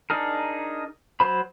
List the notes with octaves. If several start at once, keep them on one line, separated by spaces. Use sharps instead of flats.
D4 D#4 G#4 A#4
F#3 C5 B5